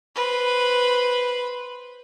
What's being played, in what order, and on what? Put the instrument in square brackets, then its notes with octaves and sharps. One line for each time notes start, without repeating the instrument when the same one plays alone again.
[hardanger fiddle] B4 C5